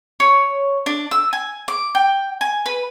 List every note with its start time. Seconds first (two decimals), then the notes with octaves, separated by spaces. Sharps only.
0.20 C#5
0.86 D4
1.11 E6
1.33 G#5
1.68 D6
1.95 G5
2.41 G#5
2.66 B4